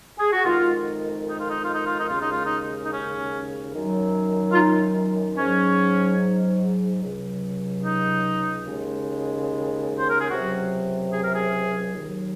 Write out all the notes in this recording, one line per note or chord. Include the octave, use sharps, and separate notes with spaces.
G#4
F#4
F2 D#3 G#3 F4
D#4
F4
D#4
F4
D#4
F4
D#4
D#2 C#3 G#3 F4
D#4
F4
D#4
D#4
C#4
F#2 D#3 F#3
F4
D#4
G#2 F#3 C#4
C#2 C3 F#3
D#4
D#2 C#3 G#3
C5
A#4
G#4
C#2 C3 F#3 F#4
G#4
A#4
G#4
D#2 D#3 F#3